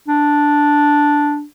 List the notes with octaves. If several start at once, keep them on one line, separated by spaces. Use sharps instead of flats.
D4